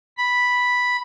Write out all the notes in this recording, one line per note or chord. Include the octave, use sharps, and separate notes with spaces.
B5